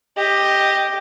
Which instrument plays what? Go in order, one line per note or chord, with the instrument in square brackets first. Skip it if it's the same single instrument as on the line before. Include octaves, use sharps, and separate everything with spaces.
[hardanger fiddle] G4 D#5